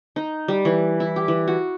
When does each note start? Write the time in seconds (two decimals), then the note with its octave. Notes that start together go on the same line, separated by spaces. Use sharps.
0.16 D#4
0.48 G3
0.65 E3
1.00 E4
1.16 G4
1.28 E3
1.48 F#4